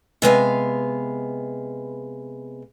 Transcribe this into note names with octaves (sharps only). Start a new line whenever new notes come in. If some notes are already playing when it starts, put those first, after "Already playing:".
C3 G#3 B3 F5